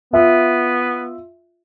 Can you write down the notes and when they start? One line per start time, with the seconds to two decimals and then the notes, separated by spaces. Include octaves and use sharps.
0.13 B3 F4 E5